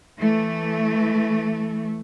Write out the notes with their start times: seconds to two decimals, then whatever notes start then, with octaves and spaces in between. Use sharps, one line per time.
0.18 E3 A3